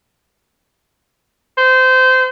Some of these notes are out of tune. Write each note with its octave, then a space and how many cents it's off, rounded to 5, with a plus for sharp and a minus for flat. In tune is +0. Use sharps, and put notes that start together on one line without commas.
C5 -25